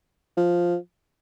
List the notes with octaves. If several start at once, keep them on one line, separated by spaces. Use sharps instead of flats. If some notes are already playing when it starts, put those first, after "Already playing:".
F3